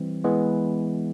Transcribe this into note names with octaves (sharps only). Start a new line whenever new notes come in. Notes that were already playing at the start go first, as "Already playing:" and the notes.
Already playing: E3 G3 C4
E3 G#3 B3